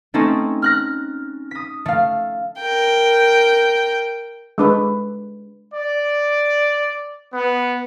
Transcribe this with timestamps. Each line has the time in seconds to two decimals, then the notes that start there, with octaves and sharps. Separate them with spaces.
0.14 A3 C4 C#4 D#4 A4
0.62 F6 F#6 A#6
1.51 D#6 B6
1.86 A3 F5
2.59 A#4 G5
4.58 G#3 D4 B4
5.74 D5
7.32 B3